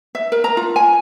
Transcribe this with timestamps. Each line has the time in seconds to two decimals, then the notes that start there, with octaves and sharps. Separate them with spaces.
0.15 E5
0.32 A#4
0.44 A#5
0.57 F4
0.76 G#5